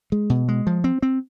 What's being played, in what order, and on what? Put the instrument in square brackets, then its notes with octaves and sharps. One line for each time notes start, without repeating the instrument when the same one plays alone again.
[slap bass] G#3
B2
G#3
F3
C4
C4